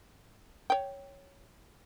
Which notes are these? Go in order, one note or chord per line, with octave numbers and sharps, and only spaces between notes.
C#5 G5